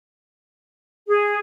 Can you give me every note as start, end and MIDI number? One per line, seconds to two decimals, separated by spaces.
1.07 1.40 68